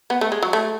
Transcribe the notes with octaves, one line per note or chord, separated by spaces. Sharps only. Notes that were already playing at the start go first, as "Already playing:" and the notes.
B3
A3
G#3
F#3
A3